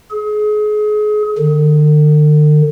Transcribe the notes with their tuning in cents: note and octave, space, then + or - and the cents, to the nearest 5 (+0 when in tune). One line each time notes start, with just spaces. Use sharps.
G#4 +30
D3 +45